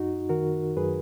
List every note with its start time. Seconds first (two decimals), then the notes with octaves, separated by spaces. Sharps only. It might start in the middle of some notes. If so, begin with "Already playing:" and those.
Already playing: F#2 D#4 F#4
0.29 D#3 F#4 A#4
0.77 F#2 G#4 B4